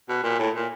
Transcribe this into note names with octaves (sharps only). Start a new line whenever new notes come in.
B2
A#2
A2
A#2